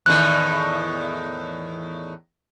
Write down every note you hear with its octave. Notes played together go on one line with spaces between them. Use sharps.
E2 A2 D#3 F#6